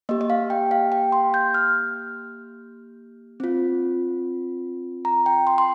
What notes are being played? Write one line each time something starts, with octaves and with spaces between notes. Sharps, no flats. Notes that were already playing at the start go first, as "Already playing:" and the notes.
A#3 G4 D#5
D#5
F5
G5
F5
G5
C6
G6
F6
C4 F4
A#5
G5
C6
C6